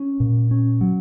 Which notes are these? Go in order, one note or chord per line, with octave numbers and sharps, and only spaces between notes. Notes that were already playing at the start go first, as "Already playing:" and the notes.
Already playing: C#4
A#2
C#4
F#3